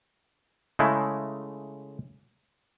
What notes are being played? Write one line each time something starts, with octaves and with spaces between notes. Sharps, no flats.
C#3 G#3 A3 E4